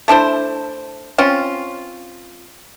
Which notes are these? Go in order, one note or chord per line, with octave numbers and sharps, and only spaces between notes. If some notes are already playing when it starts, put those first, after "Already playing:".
A3 D4 E4 C5
C4 C#4 F4